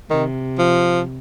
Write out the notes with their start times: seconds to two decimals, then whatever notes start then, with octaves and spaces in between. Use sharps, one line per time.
0.10 C3 D#3
0.58 F3